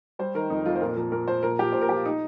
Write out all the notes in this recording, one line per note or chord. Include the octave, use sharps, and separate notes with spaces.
G3 C5
D#3 A#4
F2 D#4
F2 F4
C5
A#2 A#4
F3 A#4
A#2 A#4
F3 C5
A#2 A#4
F3 G4
A#2 C5
A#4
F3 G4
F4
D#4